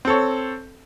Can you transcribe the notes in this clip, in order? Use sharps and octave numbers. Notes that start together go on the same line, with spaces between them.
C4 A4 C#5